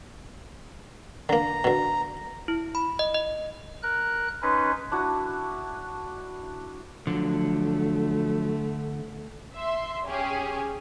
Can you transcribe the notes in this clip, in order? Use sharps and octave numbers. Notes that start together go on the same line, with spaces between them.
D3 A#3 A#5
B2 D3
E4
B5
D#5
D#5
A#4 F#6
C#4 D#4 B4 C6
D4 E4 F#4
D3 F3 F#3 A3
E5 C6
C#4 G4 G#4